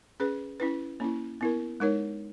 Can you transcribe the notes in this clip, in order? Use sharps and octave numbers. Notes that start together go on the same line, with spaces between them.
C#4 G#4 B4
C#4 E4 B4
A#3 C#4 E4
B3 E4 A#4
G#3 D#4 A#4 C#5